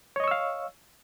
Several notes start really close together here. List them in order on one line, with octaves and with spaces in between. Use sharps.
C#5 D#5 C#6 E6 F5